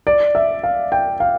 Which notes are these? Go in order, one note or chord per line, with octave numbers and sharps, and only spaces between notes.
D5
E5
F5
G5
F5